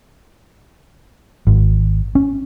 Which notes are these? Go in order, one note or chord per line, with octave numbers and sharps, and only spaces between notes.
G#1
C#4